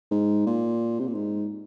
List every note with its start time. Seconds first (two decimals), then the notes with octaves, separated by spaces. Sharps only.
0.11 G#2
0.46 A#2
1.00 C3
1.07 A#2
1.15 G#2